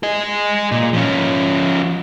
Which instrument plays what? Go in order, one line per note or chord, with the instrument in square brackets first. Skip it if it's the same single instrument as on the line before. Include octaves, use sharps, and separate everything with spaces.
[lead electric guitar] G#4 D#5
A#2
F3 C#4